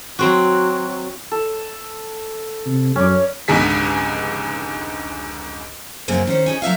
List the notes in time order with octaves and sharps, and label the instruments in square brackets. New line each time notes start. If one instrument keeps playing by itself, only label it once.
[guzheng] F#3 C4 F#4
[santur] A4
[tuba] C3
[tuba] F#2 [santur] C#4 D5
[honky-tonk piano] F1 C#2 G#2 D3 G#4 B6
[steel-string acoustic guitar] F#2 C#3 G#3 A#3 C4 C#4
D#3 C#4 C5
C#4 D#4 G#4
F#3 A3 E5 F5